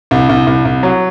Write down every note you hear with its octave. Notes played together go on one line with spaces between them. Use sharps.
C2
C2
C2
C2
F#3